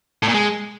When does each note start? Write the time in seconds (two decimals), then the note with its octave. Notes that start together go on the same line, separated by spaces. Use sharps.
0.23 A2
0.28 A#2
0.34 G#3